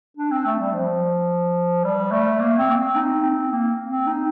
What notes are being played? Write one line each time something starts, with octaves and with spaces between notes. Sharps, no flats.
D4
C4
A3
G3
F3
G3
A3
A#3
C4
A#3
C4
D#4
C4
A#3
C4
D#4